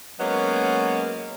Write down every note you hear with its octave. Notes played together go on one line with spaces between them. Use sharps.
F#3 G#3 A#3 B3 C#4